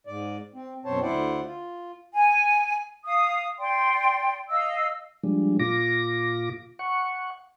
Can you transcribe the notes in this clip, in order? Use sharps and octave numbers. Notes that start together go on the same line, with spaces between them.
G#2 D5
C4
F#2 B2 C4 C5 C#5 A5
D2 E4 C5 D5 F#5
F4
G#5
F5 D#6
D5 G5 C6
D#5 F5 E6
F3 G3 G#3 D4
A#2 F4 D6 A#6
F#5 C#6